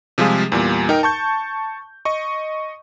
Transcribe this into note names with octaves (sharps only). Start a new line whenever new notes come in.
C3 F3 G3 G#3 F4 G#4
E2 A#2 G3
D#4 A#4 G5
A5 C#6 G6
D#5 C#6